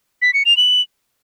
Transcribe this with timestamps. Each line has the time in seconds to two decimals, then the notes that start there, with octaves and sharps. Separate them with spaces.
0.22 B6
0.34 C#7
0.45 F7
0.57 F#7